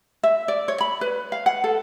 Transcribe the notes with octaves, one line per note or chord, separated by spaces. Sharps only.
E5
D5
C#5
B5
B4
F5
F#5
A4